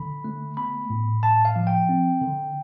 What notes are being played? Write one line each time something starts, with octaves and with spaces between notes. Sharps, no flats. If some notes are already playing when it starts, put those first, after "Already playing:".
Already playing: D3 B5
A3
B3 B5
A2
A2 A5
F5
F3
G5
C4
D3